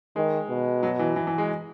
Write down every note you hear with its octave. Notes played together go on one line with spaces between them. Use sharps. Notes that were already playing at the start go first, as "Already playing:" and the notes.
D#3 G#3
B2
F#3
E3
E3
E3
G#3